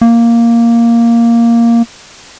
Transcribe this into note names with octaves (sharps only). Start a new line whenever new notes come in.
A#3